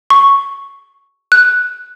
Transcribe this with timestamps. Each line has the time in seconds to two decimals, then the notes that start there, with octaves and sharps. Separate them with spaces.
0.10 C#6
1.32 F#6